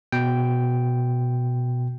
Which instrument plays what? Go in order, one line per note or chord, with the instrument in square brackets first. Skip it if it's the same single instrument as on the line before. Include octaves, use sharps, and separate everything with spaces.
[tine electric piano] B2 G5